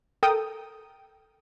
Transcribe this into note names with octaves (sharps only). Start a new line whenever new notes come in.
A4 A#4 G5 D#6